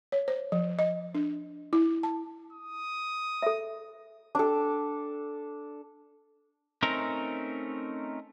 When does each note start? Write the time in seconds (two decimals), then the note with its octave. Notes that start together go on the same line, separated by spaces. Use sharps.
0.12 C#5
0.28 C5
0.52 F3
0.79 D#5
1.15 D4
1.73 E4
2.03 A5
2.53 D#6
3.42 A4 E5
4.35 D4 A4
6.82 A3 C4 C#4 D#4 A#4